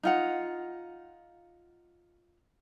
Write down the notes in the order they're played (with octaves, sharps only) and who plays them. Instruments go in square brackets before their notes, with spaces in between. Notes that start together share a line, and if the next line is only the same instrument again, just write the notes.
[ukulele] D#4 F4 F#5